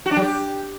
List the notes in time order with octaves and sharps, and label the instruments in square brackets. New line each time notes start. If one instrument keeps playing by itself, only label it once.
[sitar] F#4
D4
F#3
G4